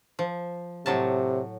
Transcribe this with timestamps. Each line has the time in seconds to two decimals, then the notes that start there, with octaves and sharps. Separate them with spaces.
0.19 F3
0.86 A2 C3 F#3 A5